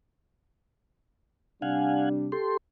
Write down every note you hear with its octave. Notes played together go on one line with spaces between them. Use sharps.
C3 G3 D4 F5 F#5 G#5
G4 A4 C6